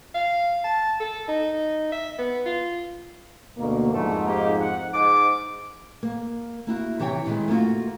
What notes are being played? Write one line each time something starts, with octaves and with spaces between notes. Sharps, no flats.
F5
A5
A4
D#4
E5
B3
F4
D2 B2 A#3
F2 G#2 A3
A#3 D#4 G4
F#5
G#2 D6
A#3
A#3 E4 F#4
C3 E3 G4 C#5 G5
A#2 D#3 E3 G#3
A3 A#3 C#4 F4 F#4